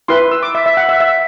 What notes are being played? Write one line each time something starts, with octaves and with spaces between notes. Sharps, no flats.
E4 B4 C6
E6
D6
E5
E5
F#5
E5
E5